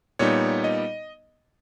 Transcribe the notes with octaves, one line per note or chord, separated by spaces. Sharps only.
A#2 G3 B3 D#4 C#5
D#5